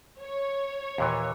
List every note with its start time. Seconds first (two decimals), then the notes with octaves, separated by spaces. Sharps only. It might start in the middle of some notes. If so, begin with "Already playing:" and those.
0.20 C#5
0.98 D#2 A#2 E3